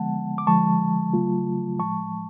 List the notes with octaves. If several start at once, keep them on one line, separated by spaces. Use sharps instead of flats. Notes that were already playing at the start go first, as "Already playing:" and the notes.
Already playing: D3 F3 G#3 B3 F#5 A5
D6
D3 F3 G#3 A5 C#6
C#3 F#3 A3 F4
A2 F3 G#3 A5 C#6